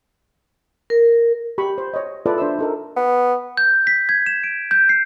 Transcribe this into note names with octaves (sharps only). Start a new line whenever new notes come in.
A#4
G4 B5 C#6
C5
C#5 D#5
E4 F4 A4 B4 D5
D4 C5 E5 E6
D#4 A4 A#4
B3
G6
B6
G#6
E7
D7
G6
C7